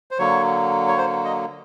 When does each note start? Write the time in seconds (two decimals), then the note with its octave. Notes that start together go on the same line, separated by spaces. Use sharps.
0.11 C5
0.18 D3 F#3 A#3 C#5
0.88 C#5
0.97 C5
1.25 D#5